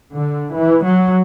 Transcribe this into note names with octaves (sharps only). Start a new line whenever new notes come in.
D3
E3
F#3